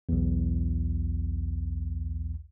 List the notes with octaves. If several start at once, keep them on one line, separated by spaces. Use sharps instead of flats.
B1 E2